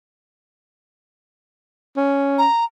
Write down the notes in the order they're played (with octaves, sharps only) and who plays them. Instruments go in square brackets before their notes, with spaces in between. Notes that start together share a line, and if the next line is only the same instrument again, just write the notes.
[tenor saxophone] C#4
[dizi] A#5